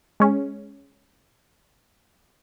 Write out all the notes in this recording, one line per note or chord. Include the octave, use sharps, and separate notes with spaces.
G#3 C#4